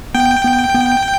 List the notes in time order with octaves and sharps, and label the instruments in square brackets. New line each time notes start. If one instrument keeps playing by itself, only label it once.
[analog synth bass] B3 [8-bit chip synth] G5
[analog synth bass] B3
B3